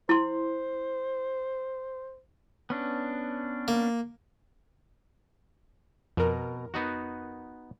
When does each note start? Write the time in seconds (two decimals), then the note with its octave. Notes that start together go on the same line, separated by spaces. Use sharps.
0.09 E4 C5 C6
2.70 B3 C#4 D4
3.68 A#3
6.17 F2 B2 A#4
6.74 B3 D#4 F#4